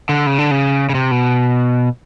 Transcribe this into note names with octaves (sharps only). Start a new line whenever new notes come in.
D3
C#3
D3
C#3
C#3
C3
B2